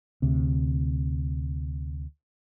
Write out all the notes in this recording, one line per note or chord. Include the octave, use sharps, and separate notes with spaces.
D2 C3